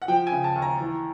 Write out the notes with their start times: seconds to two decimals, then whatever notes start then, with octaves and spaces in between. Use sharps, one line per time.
0.02 F#5
0.08 F3 G5
0.27 C#3 G#5
0.44 A5
0.55 D#2
0.62 A#5
0.81 E3